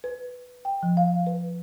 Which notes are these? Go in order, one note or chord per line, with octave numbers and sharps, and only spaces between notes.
B4
G5
F3
F5
B4